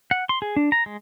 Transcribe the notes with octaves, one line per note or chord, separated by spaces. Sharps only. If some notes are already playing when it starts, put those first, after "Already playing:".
F#5
C6
G#4
D4
A#5
G#3